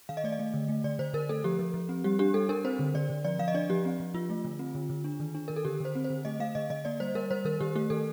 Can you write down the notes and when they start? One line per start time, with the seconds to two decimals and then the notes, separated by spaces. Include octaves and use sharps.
0.09 D#3 F5
0.17 D#5
0.24 A3 D5
0.32 D#5
0.39 A3
0.54 D3
0.68 A3
0.84 D3 D5
0.99 D3 C5
1.14 D3 A#4
1.29 A3 A4
1.44 F3 G4
1.59 F3
1.74 F3
1.89 C4
2.04 G3 G4
2.19 D4 G4
2.34 G3 A4
2.49 D4 A#4
2.65 C4 C5
2.79 D3
2.94 D3 D5
3.10 D3
3.25 F3 D5
3.39 F3 F5
3.48 D#5
3.54 D4 D5
3.70 F3 G4
3.85 C4
4.00 F3
4.14 F3 F4
4.30 A3
4.45 D3
4.59 C4
4.75 D3
4.90 D3
5.04 D4
5.20 D#3
5.35 D4
5.48 D#3 A#4
5.56 A4
5.65 D3 G4
5.80 D3 C5
5.95 C4
6.04 C5
6.10 D3
6.25 A3 D#5
6.40 A3 F5
6.55 D3 D#5
6.70 D3 D#5
6.85 A#3 D5
7.00 G3 C5
7.15 G3 A#4
7.31 G3 C5
7.45 D#3 A#4
7.60 D#3 G4
7.75 A3 G4
7.90 D#3 A4